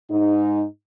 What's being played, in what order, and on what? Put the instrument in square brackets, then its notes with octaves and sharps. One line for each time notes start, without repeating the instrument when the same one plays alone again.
[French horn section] G#2 D#4